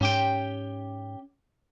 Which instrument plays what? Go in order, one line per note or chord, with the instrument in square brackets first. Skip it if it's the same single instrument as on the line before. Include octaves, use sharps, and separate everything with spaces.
[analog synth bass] G#2 [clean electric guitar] C#4 G4 G5